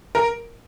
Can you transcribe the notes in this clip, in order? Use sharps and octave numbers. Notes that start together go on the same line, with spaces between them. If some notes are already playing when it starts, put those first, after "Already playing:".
A#4